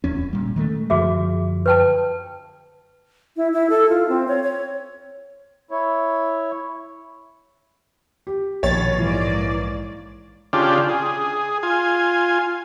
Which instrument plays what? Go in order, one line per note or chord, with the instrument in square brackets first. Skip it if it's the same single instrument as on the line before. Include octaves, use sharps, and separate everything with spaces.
[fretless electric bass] D1 E2 C#4
A#2 G3
D#3 G#3 A3
[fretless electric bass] F#2 D3 F3 [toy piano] F#4 G#4 E5
[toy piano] B4 G5 A5
[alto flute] E4
E4
A4
F4
C4
C#5
C#5
[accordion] E4 C#5
[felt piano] G4
[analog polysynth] A#1 A6 [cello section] B2 D#3 [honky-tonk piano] C#5
[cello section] G#2 A#3 D5 [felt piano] E3
[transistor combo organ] C#3 D4 F4 G4
G#4
F4 G#5